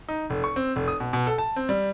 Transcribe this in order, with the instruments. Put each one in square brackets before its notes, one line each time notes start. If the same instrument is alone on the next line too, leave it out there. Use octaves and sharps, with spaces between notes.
[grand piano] D#4
F1
C#6
C4
F1
D#6
B2
B2
A4
A5
C4
G3